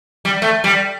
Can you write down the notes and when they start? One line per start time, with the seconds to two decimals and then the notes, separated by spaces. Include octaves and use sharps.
0.25 G3
0.42 A3
0.64 G3